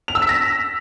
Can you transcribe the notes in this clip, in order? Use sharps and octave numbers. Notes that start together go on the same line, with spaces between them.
F7
E6
B6
A#6